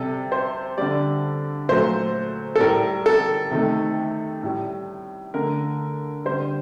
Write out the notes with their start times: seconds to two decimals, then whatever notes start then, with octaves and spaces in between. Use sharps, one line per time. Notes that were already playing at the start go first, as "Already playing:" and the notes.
Already playing: C3 G3 A4
0.32 C5
0.78 D3 G3 D5
1.69 A#2 F#3 A3 C5
2.56 A4
2.60 A2 G3 A#4
3.06 A4
3.51 C3 D#3 A3
4.43 A2 G3
5.34 D3 A3 A#4
6.25 D3 G3 C5